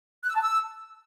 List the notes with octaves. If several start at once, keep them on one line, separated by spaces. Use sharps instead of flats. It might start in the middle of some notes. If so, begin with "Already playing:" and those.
F#6
E6
A5
E6